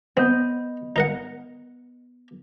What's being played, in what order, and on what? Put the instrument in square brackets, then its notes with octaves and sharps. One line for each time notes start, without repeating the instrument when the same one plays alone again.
[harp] B3 D#5 G6 [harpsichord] C4
[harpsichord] D#4 A#4 F#5